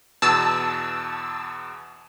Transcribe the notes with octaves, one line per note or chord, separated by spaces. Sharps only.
E2 B2 A5 E6